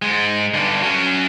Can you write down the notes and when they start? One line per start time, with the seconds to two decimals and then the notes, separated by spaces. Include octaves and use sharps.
0.02 G#2 G#3
0.54 G2 D3
0.82 F#3 C#4